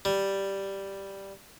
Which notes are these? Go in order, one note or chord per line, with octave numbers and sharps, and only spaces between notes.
G3